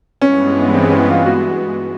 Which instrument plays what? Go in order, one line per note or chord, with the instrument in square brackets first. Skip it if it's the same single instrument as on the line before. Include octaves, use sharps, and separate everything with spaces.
[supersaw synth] G2 E3 G#3 B3 [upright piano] C#4
[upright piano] C4
C#4
F4
F#4